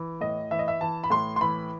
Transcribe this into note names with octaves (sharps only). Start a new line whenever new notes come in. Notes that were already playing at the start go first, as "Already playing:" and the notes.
Already playing: E3
A2 D#5
E3 E5
D#5
E5
E3 A5
B5
A2 C6
C6
E3 B5